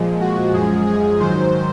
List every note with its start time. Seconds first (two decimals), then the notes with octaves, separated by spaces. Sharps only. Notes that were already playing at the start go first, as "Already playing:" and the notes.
Already playing: A#2 F3 G#3
0.21 F#4
0.53 F#2 F3 G#3 G#4
0.86 G#4
1.19 G#2 D#3 F#3 C5